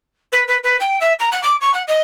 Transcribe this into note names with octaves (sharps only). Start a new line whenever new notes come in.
B4
B4
B4
G5
E5
A#5
F#5
D6
C#6
F#5
D#5